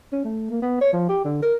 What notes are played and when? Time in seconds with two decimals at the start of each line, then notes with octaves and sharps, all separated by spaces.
0.12 C#4
0.24 A3
0.51 A#3
0.62 B3
0.81 C#5
0.93 F3
1.09 G4
1.24 D3
1.43 A#4